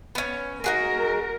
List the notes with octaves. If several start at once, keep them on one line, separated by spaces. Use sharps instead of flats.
B3 C#4
D#4 F#4 G#4 A#4